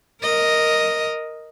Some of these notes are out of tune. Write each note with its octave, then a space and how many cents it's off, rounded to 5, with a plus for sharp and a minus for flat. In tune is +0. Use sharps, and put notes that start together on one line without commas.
A#4 +0 D#5 +0